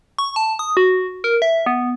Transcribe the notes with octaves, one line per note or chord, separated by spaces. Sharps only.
C#6
A5
D#6
F#4
A#4
E5
B3